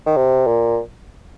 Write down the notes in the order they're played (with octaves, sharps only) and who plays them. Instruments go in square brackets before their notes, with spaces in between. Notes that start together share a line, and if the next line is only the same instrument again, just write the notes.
[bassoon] D#3
C3
A#2